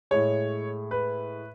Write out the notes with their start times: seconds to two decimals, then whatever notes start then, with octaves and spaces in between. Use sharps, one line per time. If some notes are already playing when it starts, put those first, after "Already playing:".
0.11 A2 G#3 C#5
0.91 B4